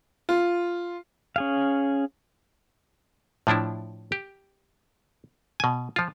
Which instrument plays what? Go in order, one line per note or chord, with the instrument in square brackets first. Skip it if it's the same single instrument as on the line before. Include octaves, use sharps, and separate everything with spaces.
[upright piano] F4
[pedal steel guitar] C#4 G#4 F5
[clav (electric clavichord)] A2 F3 D4 E4
G4
B2 G#5
F3 F4